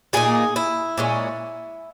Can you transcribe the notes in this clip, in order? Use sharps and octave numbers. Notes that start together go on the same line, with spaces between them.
A#2 A#3 D#4 G#4
E4
A#2 G#3 C#4